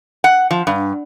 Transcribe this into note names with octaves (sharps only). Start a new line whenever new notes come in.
F#5
F3
G2